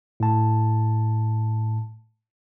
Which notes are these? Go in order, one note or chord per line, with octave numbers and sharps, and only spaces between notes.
A2 A5